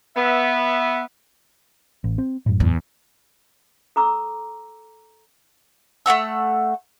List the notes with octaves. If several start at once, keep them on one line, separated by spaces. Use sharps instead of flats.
B3 E5
A1
C4
F#2 A2
E2
A4 A#5 D6 E6
A3 A#3 F#5 E6